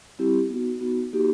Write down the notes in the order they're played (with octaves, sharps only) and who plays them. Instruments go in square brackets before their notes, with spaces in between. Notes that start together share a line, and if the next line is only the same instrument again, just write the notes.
[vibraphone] G3 C4 E4 G4
B3 D#4 F#4
B3 D#4 F#4
A#3 D#4 F#4 G4